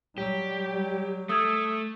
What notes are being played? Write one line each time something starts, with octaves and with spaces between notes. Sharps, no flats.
F#3 G3 G4
A3 D#6 E6 G#6